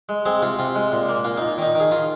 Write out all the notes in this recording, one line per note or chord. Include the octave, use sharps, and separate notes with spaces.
G#3
G#3 C4 G#4
C3 F4
C3 F4
G#3
A#2
A#3
A#2 F4
A#2 D#4
D#3 D#4
D#3
G#4
D#3 F4